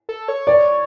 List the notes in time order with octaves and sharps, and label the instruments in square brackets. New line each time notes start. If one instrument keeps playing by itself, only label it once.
[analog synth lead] A4
C#5
[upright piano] D5